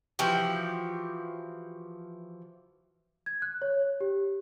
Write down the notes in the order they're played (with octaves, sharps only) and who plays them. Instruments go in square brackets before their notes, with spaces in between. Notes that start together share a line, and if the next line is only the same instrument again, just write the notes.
[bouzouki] E3 F3 F#4 G4
[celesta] G#6
F#6
C#5
G4